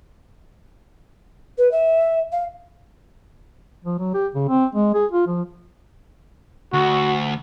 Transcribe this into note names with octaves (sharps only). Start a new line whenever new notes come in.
B4
E5
F5
F3
F#3
G4
C#3
C4
G#3
G#4
F4
F3
D2 F#4